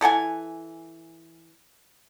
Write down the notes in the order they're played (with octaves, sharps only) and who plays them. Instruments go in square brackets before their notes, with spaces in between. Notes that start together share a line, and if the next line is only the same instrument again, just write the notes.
[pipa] E3 A4 F#5 G#5